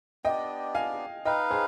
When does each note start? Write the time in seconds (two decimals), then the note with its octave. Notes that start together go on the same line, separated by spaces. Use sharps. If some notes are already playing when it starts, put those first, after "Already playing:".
0.25 B3 D4 G4 D5 D#5 G5
0.75 F5 G#5
1.25 D#4 B4 D#5 F5 G5
1.50 G#4 C5